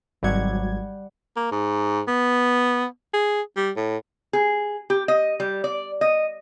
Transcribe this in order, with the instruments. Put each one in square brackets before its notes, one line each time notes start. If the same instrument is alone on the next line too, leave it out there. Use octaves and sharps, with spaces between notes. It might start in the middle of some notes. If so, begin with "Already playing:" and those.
[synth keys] G#1 F#3 G#6 [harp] G3 F#5
[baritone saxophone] A#3
G#2
B3
G#4
G3
A2
[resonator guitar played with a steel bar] G#4
G4
D#5
G3
D5
D#5